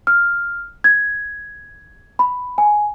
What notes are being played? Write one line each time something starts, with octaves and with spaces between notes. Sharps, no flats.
F6
G#6
B5
G#5